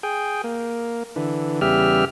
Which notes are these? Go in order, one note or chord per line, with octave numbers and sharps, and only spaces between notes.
G#4 G5
A#3
D3 E3
E2 C#3 G3 G4 E5 F6